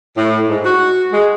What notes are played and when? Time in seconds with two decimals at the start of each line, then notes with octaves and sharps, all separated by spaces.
0.17 A2
0.49 G#2
0.65 F#4
1.13 G#3